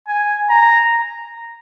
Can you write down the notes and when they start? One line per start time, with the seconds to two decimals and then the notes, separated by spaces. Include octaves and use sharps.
0.08 G#5
0.50 A#5